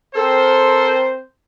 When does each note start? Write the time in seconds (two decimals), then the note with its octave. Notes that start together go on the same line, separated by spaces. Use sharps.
0.15 C4 A4 A#4 C5